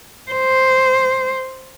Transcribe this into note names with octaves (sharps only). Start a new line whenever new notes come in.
C5